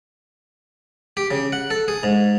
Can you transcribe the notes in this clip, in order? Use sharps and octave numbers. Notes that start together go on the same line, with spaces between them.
G4
C#3
F#5
A4
G#4
G#2